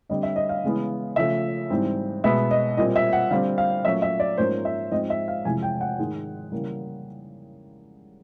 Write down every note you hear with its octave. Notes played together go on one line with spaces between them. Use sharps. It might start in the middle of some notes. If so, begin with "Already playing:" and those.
D3 G3 C4 D#5
E5
D#5
F5
C#3 E3 G#3 B3
C#3 F3 A3 E5
G#2 E3 G3 C4
B2 G#3 B3 E5
D#5
A#2 G3 C4 D#5
E5
F#5
D3 G3 C4 F5
F5
A#2 F#3 A3 C#4 E5
E5
D5
G#2 F3 A#3 C#4 C5
E5
G#2 F3 G#3 C4 D#5
E5
F5
F2 C3 E3 G#3 G#5
G5
F#5
G#2 D#3 G#3
C#3 E3 G3 A#3